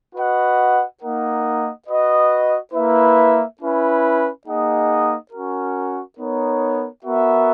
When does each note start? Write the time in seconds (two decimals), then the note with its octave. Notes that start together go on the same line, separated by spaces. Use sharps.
0.15 F#4 B4 D#5 F#5
1.02 A#3 D#4 A#4 D#5 F#5
1.88 F#4 B4 D#5
2.74 A#3 E4 B4 E5
3.60 C#4 E4 B4
4.46 A#3 D#4 G#4 D#5 F#5
5.32 C#4 F#4 A#4
6.19 B3 D#4 A#4 C#5
7.05 B3 F#4 A#4 E5